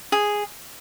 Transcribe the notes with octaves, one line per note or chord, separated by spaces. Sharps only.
G#4